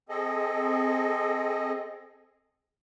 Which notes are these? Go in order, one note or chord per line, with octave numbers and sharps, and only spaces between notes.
C4 G#4 A4 D#5